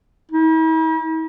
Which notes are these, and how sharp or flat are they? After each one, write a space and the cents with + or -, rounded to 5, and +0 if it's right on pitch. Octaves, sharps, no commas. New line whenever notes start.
E4 -45